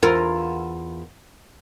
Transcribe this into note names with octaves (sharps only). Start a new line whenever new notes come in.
E2 F4 A#4